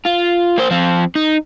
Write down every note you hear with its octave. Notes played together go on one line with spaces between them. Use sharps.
F4
A#3 C5
F3 C4
D#4